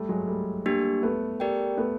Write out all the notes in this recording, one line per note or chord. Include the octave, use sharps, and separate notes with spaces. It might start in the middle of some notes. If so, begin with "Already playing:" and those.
Already playing: G3 A3
F#3 G#3
G3 A3
A#3 D4 G4
A3 B3
G4 A#4 D5 G5
A3 B3